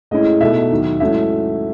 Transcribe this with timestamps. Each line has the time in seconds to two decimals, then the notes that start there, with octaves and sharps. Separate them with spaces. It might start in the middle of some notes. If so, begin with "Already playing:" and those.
0.11 A2 G#3 C#4 E4 D#5
0.41 B2 A3 D#4 E5
0.71 D#2 D#3 F#3
1.00 G#2 F#3 A3 C#4 E4 E5